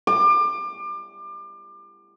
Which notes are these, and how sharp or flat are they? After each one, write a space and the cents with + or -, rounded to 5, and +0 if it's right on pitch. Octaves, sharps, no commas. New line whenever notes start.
D6 +30